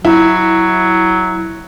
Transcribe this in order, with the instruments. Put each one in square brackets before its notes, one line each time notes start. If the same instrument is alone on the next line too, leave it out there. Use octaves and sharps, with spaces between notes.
[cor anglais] F#3 [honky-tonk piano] E4